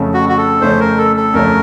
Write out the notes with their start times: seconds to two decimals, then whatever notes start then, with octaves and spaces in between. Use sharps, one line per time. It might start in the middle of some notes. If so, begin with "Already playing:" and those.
Already playing: F2 C#3 A3 C#4
0.14 F#4
0.29 F#4
0.38 A4
0.61 F2 C#3 A3 C#4 C5
0.80 A#4
0.98 A4
1.16 A4
1.34 F2 C#3 A3 C#4 A#4